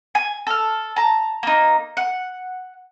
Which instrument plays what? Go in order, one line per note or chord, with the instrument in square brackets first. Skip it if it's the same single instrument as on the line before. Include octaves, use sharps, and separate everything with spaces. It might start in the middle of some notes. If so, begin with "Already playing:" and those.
[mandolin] G#5
A4 F6
A5 A#5
A#3 D#4
F#5